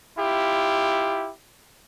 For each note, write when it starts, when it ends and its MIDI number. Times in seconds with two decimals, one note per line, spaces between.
0.17 1.29 64
0.17 1.29 65
0.17 1.29 67